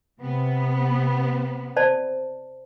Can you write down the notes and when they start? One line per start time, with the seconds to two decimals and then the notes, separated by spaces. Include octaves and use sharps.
0.19 C3 B3
1.76 C5 D5 A5